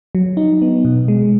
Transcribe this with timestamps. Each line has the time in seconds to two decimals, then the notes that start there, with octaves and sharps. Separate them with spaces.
0.15 F#3
0.37 D#4
0.62 B3
0.85 B2
1.08 G#3